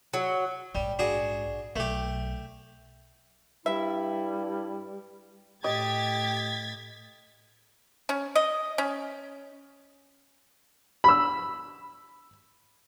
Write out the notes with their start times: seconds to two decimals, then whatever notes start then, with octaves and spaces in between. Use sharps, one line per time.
0.13 F#3
0.75 A#1 G#2 G3
0.99 D4 F#4 G#4
1.76 B1 A3 G4
3.66 G2 G3 E4 E5
5.64 A2 G4 D#5 G#6 A6 B6
8.09 C#4
8.35 D#5
8.78 C#4
11.04 B5 E6